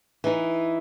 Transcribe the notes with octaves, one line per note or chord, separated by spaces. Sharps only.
E3 D#4